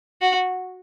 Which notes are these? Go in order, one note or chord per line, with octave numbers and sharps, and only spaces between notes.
F#4